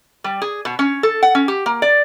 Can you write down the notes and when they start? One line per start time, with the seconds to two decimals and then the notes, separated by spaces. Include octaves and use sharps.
0.24 G3
0.42 G#4
0.65 B2
0.79 C#4
1.03 A4
1.23 F#5
1.35 C#4
1.48 G4
1.66 A#3
1.82 D5